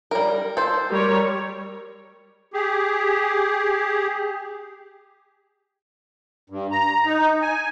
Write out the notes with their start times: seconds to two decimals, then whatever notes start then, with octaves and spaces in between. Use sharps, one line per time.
0.11 G3 A#4
0.57 A4 C5
0.90 G3 A#4 C#5
2.53 G4 G#4
6.50 G2
6.71 A#5
7.06 D#4
7.41 G#5